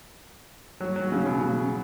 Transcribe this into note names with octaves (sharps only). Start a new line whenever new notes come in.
F#3
F#3
C#3
B2
C#3